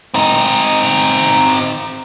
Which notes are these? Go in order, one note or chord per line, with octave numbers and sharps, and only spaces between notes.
C4 D#4